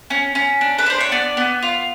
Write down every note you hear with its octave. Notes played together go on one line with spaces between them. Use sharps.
C#4
C#4
D4
B4
D4 C5
C#5
B3 D5
B3
F4